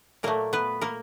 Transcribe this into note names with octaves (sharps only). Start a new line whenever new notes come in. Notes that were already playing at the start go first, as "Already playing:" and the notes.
A#2 F#3 A3 A#3 A#4
B3 B4
A#3 A#4